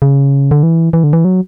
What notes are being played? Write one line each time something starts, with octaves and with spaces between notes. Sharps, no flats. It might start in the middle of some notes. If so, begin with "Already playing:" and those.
C#3
D3
E3
E3
D3
E3
F#3